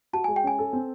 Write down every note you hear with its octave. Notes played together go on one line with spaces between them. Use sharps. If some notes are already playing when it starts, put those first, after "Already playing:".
F#4 A5
G#5
G#3
G5
C#4 G#5
A4
C4